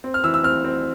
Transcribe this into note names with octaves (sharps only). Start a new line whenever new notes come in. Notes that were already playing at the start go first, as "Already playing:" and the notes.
C4
F6
E3 E6
E6
C4 F6
C4